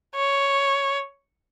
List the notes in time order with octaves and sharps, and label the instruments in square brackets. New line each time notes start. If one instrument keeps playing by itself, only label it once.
[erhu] C#5